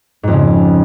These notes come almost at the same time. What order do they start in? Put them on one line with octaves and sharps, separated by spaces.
G#2 F2 C#3